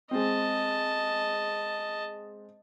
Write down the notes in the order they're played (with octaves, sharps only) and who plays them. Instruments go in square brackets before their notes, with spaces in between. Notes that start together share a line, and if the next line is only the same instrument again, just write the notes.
[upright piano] G#3 C4 [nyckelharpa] D#5 A5